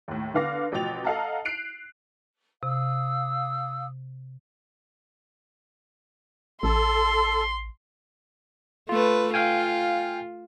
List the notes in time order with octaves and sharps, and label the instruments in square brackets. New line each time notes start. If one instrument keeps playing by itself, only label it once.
[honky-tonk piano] D#2 A2
D3 B3 F5 D6 A#6
A1 B2 F3 G5 A6 F7
A4 D#5 F5 F#5 A5 A#5
F#6 C7 D7 F7
[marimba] C3 [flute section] F5 D#6 E6
[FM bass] A1 [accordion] A4 [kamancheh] C6
[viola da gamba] A3 B4 [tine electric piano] F4
[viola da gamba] F4 [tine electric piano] F5 G5 G#5